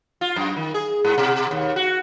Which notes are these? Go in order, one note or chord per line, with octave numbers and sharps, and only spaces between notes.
F4
F#2
D#3
G#4
G#2
B2
D#2
F#4